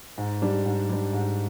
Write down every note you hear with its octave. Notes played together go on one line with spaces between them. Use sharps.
G#2
G3 D4
G#2
G3 D4
G#2